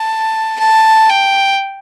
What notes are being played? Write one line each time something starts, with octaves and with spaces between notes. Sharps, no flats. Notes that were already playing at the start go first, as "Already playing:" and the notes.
Already playing: A5
A5
G5